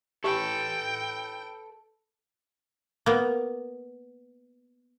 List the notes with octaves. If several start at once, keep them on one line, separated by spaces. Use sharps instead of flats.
G4 A4 B4 G5
A#3 B3